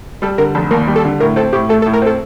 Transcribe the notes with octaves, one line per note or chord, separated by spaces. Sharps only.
G3 A4
D3 A#4
F1 A4
D#2 A#4
G3
A4
D3
A2 A#4
C4 A4
A2 G4
A3 A4
A4
A2
A#4
C4 A4